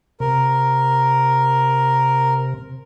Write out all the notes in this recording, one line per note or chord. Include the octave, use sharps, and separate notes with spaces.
C3 A#4